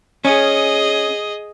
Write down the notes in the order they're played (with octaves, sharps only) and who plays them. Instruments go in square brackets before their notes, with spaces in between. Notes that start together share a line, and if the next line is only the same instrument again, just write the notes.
[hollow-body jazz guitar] C#4 [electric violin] G#4 D#5